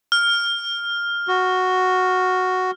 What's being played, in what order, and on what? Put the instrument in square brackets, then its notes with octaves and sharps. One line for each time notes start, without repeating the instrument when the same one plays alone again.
[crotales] F6
[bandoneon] F#4